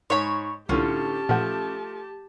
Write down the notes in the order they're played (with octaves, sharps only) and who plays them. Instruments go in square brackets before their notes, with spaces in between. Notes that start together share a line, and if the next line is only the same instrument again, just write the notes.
[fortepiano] G#2 [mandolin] C#5 B5
[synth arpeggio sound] C2 [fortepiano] A2 D3 F4 [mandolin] C#4 [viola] G4 A5
[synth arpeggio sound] A#2 F#5 [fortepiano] F3 A3 A4